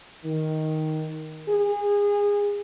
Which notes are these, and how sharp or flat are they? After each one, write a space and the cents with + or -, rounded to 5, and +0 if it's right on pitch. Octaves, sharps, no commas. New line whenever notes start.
D#3 +5
G#4 -25